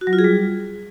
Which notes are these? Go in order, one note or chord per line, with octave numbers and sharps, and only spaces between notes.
F#4
F#3
F4
G#4
G3